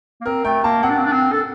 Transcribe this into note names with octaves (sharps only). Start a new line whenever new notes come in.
A#3
C4 A#4
A3 G5
A#3 A5
C4 F#5
D4
C4
D4
C4
A4